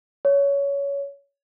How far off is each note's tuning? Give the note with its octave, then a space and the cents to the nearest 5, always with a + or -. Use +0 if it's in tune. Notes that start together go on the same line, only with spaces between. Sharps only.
C#5 +20